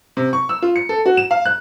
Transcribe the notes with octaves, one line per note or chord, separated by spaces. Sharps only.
C3
C#6
E6
F4
C#7
A4
F#4
E7
F5
F#6